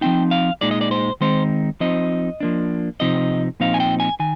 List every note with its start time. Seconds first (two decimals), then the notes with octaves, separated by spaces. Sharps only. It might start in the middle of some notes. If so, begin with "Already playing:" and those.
0.01 F3 C4 D#4 G5
0.31 F5
0.61 A#2 G#3 D#4 D5
0.71 D#5
0.81 D5
0.91 C5
1.21 D#3 G#3 C4 D#4 C5
1.80 F3 C4 D#4 D#5
2.40 F3 A#3 D4
3.00 C3 F3 C4 D#4 D#5
3.60 A#2 F3 C4 D#4 F5
3.74 G#5
3.80 G5
4.00 G#5
4.20 D#3 G#5